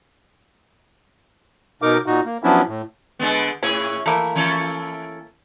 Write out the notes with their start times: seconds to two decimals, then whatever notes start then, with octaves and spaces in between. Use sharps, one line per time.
1.82 B2 D#4 A#4 D6
2.06 A#2 D#4 F#4
2.25 A#3
2.44 F3 F#3 B3 C#4 D4 E4
2.68 A2
3.19 D3 G#3 B3
3.63 A2 C#4 E4 G#4
4.06 E3 A3 A#3 E4
4.36 E3 C#4 A4